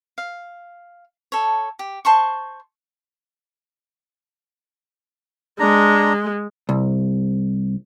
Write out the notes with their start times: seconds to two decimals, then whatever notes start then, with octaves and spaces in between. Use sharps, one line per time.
0.18 F5
1.32 A4 C#5
1.79 G4
2.05 C5 A5 C6 C#6
5.60 G#3 D4 A#5
6.69 C2